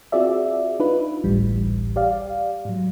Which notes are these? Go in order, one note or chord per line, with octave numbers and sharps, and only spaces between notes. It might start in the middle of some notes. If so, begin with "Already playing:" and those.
C4 F4 F#4 G#4 D5 E5
D4 D#4 F4 B4
G#1 C#2 A2 E3 G3
G4 D5 F5
G#2 F#3